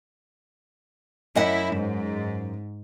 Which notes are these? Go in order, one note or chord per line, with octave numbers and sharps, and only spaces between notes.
F#2 E4 D#5 F#5
G#2